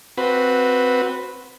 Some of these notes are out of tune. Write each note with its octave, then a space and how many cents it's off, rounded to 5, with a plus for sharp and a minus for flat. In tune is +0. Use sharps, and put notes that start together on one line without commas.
C4 -5 F#4 -10 B4 +0